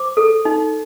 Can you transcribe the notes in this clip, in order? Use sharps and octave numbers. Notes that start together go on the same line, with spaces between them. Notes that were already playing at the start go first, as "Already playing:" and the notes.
Already playing: C5 D6
A4
D#4